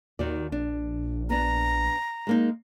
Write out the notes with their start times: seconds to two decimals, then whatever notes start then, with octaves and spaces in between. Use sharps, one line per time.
0.19 D#2 D#3 F#4 D5
0.52 A#1 D4
1.30 B3 D4 A#5
2.27 G#3 A#3 D#4